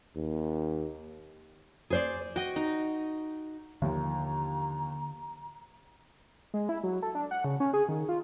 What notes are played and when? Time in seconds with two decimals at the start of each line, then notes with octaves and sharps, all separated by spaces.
0.15 D#2
1.90 G#4 C5 D5
2.36 F#4 D#5 G5
2.56 D#4
3.82 D#2 D3 F3 A#3 A#5
6.54 G#3
6.69 E4
6.84 F#3
7.02 A4
7.15 D4
7.31 F#5
7.44 C#3
7.60 C#4
7.73 G#4
7.89 D#3
8.09 F4